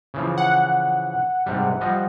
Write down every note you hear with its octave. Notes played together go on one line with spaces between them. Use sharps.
C#3 E3 F3
F#5
G#2 C3 G3
F3 G3 D#5